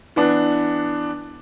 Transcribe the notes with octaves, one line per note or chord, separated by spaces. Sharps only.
E3 B3 D4